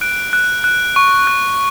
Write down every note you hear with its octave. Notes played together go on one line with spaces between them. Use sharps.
F#6 D7
F#6
F#6
C#6
F#6